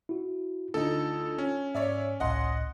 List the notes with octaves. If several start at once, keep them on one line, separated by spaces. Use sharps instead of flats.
E4 F#4
D2 D3 D#4 F4 A4
C#4
G#2 C#5 D5 E5
G#1 C#2 A2 D#5 F#5 C6